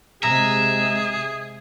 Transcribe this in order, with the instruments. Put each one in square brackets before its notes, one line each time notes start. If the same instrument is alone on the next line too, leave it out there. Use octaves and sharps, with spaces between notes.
[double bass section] C3 G#3 [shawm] G#4 [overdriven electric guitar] E5 [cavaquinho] A#5